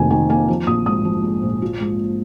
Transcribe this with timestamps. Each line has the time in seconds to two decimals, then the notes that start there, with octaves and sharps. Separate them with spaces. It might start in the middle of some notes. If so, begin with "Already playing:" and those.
Already playing: F1 F2 D#3 A#3 G#5
0.10 D#3 G#5
0.29 A#3 G#5
0.48 F3
0.67 A#1 D#6
0.86 G#2 D#6
1.05 F3
1.24 G#2
1.43 A#1
1.62 F4
1.80 G#2